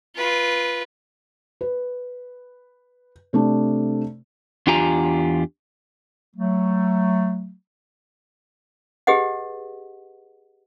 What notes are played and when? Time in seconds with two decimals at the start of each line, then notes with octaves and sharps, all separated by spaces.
0.16 F4 B4
1.61 B4
3.33 C3 A3 D4
4.67 E2 D4 F4 G4 G#5 A#5
6.36 F#3 A3
9.07 G4 G#4 B4 D#5 F#5